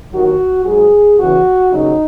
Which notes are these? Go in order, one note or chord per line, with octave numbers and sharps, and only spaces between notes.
D#2 D#3 F#3 F#4
G#2 F#3 G#4
E2 C#3 E3 F#4
D#2 C#3 F#3 D#4